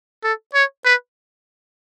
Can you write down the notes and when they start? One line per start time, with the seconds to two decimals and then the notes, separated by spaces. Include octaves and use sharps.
0.23 A4
0.54 C#5
0.85 B4